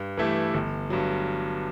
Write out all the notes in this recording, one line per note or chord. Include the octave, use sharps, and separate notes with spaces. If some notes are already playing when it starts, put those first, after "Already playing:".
Already playing: G2
E3 A3 E4 G4
G1
G2 F#3